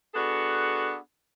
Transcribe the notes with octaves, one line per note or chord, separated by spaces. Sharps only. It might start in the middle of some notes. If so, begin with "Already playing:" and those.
B3 D4 F#4 G#4 A4